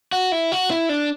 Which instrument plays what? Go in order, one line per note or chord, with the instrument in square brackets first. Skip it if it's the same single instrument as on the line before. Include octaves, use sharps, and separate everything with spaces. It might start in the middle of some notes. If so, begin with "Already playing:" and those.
[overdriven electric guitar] F#4
E4
F#4
E4
D4